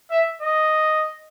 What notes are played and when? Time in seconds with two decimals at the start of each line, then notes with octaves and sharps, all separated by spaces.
0.11 E5
0.42 D#5